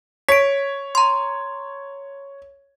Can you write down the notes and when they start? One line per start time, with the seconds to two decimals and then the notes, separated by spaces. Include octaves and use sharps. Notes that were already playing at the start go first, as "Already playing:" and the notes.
0.29 C#5 B6 D7
0.95 A#5 C6